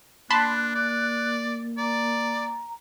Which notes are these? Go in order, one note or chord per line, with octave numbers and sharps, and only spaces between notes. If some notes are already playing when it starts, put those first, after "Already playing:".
A#3 D4 A5 B5 C6 F#6
D5
D5 A#5